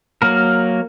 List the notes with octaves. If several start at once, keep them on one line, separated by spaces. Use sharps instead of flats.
F#3 A#3 A#4